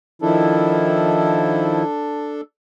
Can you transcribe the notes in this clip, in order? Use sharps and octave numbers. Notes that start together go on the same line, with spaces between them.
D#3 F3 D4 E4 A4